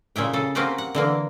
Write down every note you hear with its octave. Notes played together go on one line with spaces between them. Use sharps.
A#2 C#3 E4 G5
C#3 A4
A#3 C4 C#4 F#4 G4 B4
F#5
D3 E3 A#3